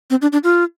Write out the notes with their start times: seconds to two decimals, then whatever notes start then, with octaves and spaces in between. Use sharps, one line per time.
0.10 C4
0.22 D4
0.33 D4
0.44 F4